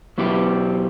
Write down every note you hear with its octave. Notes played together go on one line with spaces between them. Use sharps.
B2 F#3 B3 E4 G4